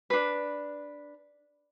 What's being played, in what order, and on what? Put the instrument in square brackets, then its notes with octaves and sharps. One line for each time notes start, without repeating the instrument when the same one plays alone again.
[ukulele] D4 B4